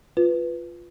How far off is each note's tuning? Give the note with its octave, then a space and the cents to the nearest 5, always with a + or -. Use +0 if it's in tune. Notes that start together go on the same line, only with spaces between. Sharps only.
F4 +0 B4 +0